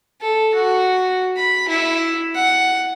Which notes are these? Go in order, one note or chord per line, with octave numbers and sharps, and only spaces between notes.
A4
F#4
B5
E4
F#5